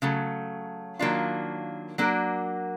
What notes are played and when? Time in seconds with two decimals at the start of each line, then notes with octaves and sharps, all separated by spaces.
0.02 C#3 F#3 A3
0.99 D#3 F#3 A#3 D4 F4
1.98 F#3 A#3 D4 F#4 A#4